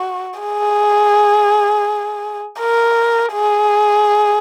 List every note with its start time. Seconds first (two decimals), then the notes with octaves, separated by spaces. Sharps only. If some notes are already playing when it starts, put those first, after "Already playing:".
Already playing: F#4
0.40 G#4
2.60 A#4
3.33 G#4